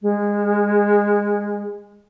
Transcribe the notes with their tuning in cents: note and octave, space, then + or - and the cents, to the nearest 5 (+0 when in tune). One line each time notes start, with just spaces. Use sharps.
G#3 -20